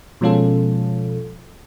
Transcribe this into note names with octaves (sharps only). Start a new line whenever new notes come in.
B2 F3 G#3 C#4 F4 A4